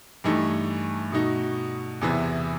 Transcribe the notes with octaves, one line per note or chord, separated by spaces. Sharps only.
G2 E3 A3 D#4
B2 A3 D#4 F#4
E2 C3 E3 B3 E4